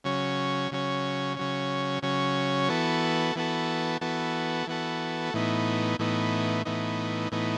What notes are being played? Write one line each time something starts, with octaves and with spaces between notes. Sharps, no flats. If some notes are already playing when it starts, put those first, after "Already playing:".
C#3 F#3 C#4
C#3 F#3 C#4
C#3 F#3 C#4
C#3 F#3 C#4
E3 B3 F#4 A4
E3 B3 F#4 A4
E3 B3 F#4 A4
E3 B3 F#4 A4
A2 E3 B3 D#4
A2 E3 B3 D#4
A2 E3 B3 D#4
A2 E3 B3 D#4